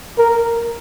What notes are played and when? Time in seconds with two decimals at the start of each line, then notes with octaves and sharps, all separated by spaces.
0.18 A#4